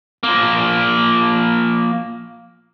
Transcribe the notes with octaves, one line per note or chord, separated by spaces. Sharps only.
F3 A#3